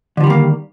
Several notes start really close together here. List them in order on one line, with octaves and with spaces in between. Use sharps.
D3 F3 G3 D#3 A#3